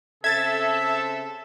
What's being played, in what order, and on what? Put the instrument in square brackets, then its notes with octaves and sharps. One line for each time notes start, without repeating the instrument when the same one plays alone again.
[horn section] C#3 C4 A4 [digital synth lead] E5 [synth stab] G#6 A6